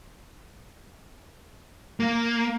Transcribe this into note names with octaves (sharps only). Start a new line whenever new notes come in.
A#3